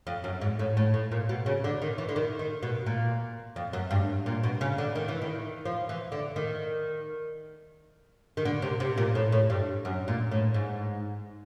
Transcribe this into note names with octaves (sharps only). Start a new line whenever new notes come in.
F2
F#2
G#2
A2
A2
A2
A#2
B2
C#3
D3
D#3
E3
D3
D#3
D#3
B2
A#2
F2
F#2
G2
A#2
B2
C#3
D3
D#3
E3
D#3
F3
E3
D3
D#3
D#3
D3
C3
C3
A#2
A2
A2
G2
F#2
A#2
A2
G#2